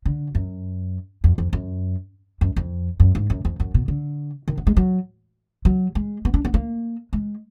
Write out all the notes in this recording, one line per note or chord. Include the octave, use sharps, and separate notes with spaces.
D3
F#2
F2
F2
F#2
F#2
F2
F#2
G#2
F#2
F2
F#2
B2
D3
D#3
B3
G#3
F#3
F#3
G#3
B3
D4
B3
A#3
G#3